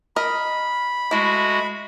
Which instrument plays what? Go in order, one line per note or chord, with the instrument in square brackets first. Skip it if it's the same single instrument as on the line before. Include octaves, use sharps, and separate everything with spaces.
[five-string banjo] A#4 D#5 [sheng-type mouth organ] B5
[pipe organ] G#3 F#4 [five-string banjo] A3 E4